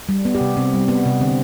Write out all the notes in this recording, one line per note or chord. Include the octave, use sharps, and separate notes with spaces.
G3
B3
G4
C3
C3 C4
G3
B3
C3
D3 C4